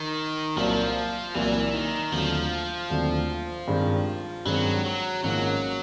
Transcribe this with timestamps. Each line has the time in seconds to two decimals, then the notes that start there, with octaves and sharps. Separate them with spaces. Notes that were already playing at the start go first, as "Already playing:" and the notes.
Already playing: D#3
0.56 C2 A#2 F3 F#3 A#3
1.34 C2 A#2 E3 F#3 A#3
1.73 D#3
2.12 D#2 D3 F3 F#3 A3 C4
2.90 D#2 D3 F#3 A3 C4
3.67 G2 D#3 G#3 C4
4.45 G2 D#3 F#3 G#3 C4
4.84 F#3
5.24 G#1 G#2 F3 F#3 A#3 C#4